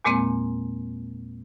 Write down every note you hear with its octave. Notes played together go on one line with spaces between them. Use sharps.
E2 A#2 G#3 A#3 C4